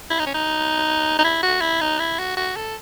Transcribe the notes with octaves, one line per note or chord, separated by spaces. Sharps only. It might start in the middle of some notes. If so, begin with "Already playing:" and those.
E4
D#4
C#4
D#4
D#4
E4
F#4
E4
D#4
E4
F#4
F#4
A4